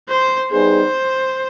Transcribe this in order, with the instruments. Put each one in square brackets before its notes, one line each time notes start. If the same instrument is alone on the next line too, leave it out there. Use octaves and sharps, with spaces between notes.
[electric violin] C5
[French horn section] G3 B3 D#4 G#4 [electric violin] C5